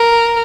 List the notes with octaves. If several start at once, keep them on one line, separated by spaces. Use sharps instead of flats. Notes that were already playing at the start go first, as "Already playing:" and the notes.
Already playing: A#4